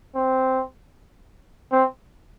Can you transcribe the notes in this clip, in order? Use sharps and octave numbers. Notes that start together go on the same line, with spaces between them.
C4
C4